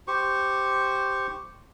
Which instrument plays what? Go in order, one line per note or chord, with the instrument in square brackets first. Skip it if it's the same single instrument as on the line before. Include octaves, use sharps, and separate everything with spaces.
[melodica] G4 C5 C#6